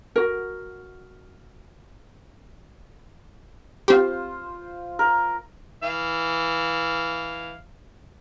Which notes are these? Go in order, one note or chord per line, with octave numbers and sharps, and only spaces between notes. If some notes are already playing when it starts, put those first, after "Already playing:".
F#4 A#4
C4 F4 G4 C5
A#4
E3 F5